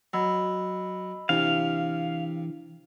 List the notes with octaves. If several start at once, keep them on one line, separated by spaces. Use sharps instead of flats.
F#3 D#5 B5 E6
C3 E3 D4 E4 F5